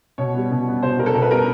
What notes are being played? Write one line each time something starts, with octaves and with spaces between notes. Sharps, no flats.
B2 C#5
G3 B3
B2
G3 B3
B2 C5
G3 B3 A#4
A4
B2 A#4
B4
G3 B3 A#4